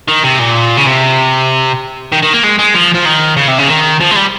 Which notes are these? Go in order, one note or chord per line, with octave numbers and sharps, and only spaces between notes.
D#3
C3
A#2
C#3
C3
D#3
D#3
A#3
G#3
G#3
F3
F3
D#3
C#3
C3
C#3
D#3
F3
G#3
G3